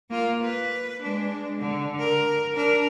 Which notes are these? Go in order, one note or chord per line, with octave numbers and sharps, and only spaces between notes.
A#3 F4
B4
G#3 D4
D3
A#4
D4 A#4